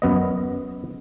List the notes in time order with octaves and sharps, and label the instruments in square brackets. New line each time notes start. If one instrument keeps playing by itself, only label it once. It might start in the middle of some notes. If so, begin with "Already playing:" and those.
[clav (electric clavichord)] F#2 B3 D#5